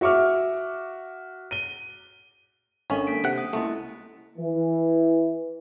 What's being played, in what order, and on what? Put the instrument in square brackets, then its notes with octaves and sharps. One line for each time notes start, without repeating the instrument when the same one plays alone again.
[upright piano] F#4 E5 C#6 D6 F6
D#7 G7
[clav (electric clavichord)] G#1 C#4 [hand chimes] D4 A4 A#4
[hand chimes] A#3 B6 D7
[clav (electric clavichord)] C3 F#5
[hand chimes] D#6
[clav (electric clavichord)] C#2 A3 [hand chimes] A#3 E4 D#5
[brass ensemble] E3